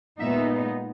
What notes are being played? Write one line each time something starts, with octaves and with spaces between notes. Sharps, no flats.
A#2 G#3 B3 D#4 E5